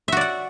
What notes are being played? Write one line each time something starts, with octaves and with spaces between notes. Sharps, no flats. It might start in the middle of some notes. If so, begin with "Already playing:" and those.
F#4 D5 E5 F#5